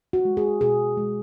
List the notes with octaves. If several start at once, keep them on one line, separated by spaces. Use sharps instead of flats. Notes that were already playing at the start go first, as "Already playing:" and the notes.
F#4
G#3
G#4
B2 G#4
G#3